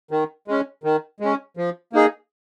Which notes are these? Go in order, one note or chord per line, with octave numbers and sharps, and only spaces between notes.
D#3
G#3 C#4
D#3
G#3 C#4
F3
A#3 D#4 G#4